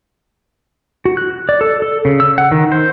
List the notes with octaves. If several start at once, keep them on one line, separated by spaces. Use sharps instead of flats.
F#4
F#6
D5
A4
A4
C#3
E6
F#5
D#3
C5